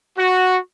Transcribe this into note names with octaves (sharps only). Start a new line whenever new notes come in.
F#4